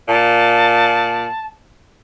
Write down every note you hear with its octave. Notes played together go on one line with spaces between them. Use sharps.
A#2 A5